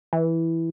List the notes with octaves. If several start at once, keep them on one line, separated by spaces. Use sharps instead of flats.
E3